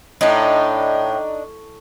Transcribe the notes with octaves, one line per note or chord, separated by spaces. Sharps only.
A2 D4 D#4